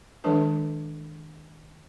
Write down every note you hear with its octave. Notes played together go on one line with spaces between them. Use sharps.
D#3 F3 G#3 D4 A4 B4